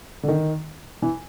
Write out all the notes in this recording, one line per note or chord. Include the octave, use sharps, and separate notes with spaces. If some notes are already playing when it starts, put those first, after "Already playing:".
D3
D#3
E3